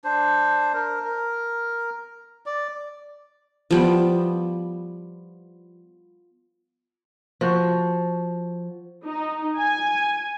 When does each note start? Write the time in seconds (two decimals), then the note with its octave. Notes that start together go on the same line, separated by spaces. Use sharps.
0.04 D4 C5
0.74 A#4
1.04 A#4
2.46 D5
3.71 F3 G3 B3
7.41 F3 F#4
9.06 D#4
9.58 G#5